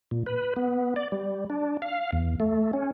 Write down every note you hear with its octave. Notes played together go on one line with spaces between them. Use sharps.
A#2
B4
B3
D5
G3
D4
F5
E2
A3
C#4